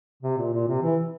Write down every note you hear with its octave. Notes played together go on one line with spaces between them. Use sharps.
C3
A#2
A#2
C3
E3